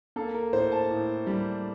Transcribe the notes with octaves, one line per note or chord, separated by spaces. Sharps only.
A#3 A4
A#4
A2 C5
A5
A2
G3